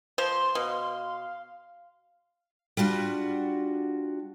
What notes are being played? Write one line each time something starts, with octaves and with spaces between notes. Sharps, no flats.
F3 C5 C6
B2 F5
G3 D4 F4 F#4